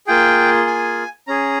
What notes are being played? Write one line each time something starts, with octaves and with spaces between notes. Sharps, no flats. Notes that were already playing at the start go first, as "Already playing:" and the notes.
A#3 F4 G#4 G5
G#5
C#4 G#4 A#5